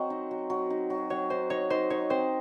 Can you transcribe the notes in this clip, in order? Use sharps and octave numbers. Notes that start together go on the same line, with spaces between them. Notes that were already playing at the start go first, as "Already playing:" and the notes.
Already playing: F#3 C4 D#5
D#4
F#3
F#3
D#4
F#3
F#3 C#5
D#4 C5
D#4 C#5
D#4 C5
D#4 C#5
C4 C5